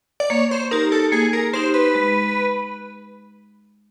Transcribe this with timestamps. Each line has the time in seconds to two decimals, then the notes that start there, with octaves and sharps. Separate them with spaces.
0.20 D5
0.30 A#3 C#5
0.51 C5
0.71 D#4 G4 A#4
0.92 A4
1.12 A#3 G#4
1.33 A#4
1.53 D#4 G4 C5
1.74 B4
1.95 G#3